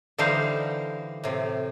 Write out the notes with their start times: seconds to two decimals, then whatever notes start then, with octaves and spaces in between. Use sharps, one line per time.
0.18 D3 E3 G3 D#4 C5 F5
1.24 A2 C3